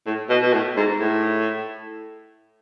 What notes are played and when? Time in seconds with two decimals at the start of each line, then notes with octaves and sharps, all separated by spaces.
0.06 A2
0.29 B2
0.42 B2
0.53 A2
0.77 G#2
1.00 A2